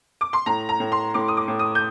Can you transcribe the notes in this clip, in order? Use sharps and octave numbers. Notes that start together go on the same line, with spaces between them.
D6
C6
A2 A#5
A#5
A2
C6
A2 D6
D#6
D6
A2
D#6
G6